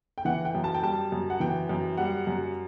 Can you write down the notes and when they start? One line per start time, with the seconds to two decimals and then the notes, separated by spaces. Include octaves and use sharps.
0.18 G5
0.25 E3 F#5
0.45 G5
0.55 F#2
0.64 A5
0.74 G5
0.82 G3 A5
1.12 F#2
1.30 F#5
1.40 E3 G5
1.69 F#2
1.97 G3 F#5
2.27 F#2